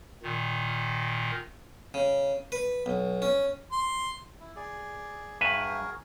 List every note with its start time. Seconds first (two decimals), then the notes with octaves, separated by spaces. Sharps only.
0.23 A#2 D#3
1.94 C#3
2.52 B4
2.86 B1
3.22 C#4
3.72 C6
4.40 E4
4.56 G#4 D5
5.41 G2 F#4 G#4 A#4 B4 E5